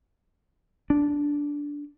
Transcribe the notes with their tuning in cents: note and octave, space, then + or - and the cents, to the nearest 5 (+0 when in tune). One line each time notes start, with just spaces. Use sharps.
D4 -10